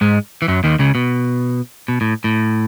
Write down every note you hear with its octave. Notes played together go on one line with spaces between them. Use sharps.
G#2 G#3
E3
F#2 F#3
D#2 D#3
C#2 C#3
B2
B2
A2
A2